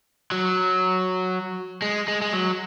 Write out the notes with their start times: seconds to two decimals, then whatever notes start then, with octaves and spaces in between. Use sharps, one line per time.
0.32 F#3
1.82 G#3
2.08 G#3
2.22 G#3
2.33 F#3